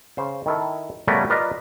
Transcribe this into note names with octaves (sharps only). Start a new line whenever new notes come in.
C#3 C5
D#3 E4 A4
C#3 G3 A3 B3 C#4 A#4
F4 A#4 B4 D5 D#5 F5